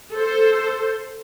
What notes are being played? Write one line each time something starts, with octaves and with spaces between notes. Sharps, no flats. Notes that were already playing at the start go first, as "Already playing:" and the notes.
A4 C5